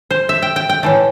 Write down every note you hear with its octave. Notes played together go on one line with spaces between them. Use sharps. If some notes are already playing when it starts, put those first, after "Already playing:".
C5
E5
G5
G5
G5
A2 E3 A3